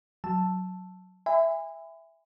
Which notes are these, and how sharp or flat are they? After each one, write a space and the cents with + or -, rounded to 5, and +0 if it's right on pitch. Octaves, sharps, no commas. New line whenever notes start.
F#3 +0 A5 +0 E6 +0
E5 +0 G#5 -30 B5 +40